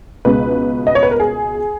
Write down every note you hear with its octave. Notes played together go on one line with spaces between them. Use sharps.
C#2 B2 G#3 B4
D#5
C#5
B4
A#4
G#4